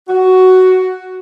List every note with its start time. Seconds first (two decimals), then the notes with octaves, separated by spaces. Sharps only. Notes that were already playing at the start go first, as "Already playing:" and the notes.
0.08 F#4